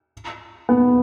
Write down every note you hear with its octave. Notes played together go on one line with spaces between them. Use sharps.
B3